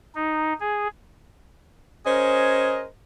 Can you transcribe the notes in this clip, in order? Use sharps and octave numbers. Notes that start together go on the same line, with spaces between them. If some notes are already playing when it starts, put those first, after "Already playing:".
D#4
G#4
C#4 G#4 A#4 C5 D#5